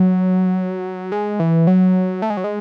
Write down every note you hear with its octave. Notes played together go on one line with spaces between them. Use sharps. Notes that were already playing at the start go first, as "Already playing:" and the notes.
Already playing: F#3
G#3
E3
F#3
A3
G#3
F#3
G#3